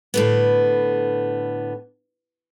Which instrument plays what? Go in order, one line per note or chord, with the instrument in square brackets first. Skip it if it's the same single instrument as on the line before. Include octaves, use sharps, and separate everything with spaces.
[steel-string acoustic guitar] A2 D3 B3